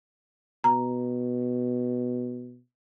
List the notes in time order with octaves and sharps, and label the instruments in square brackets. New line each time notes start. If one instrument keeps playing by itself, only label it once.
[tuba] B2 [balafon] A#5